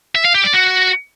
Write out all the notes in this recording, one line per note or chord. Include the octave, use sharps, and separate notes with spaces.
E5
F5
G4
D5
F#4